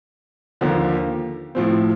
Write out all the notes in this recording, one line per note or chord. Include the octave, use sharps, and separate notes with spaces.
D#2 D3 F3
A2 F3 C4